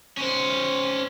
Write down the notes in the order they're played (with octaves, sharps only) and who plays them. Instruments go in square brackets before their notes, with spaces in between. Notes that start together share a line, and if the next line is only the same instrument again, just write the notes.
[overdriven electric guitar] C#4 C5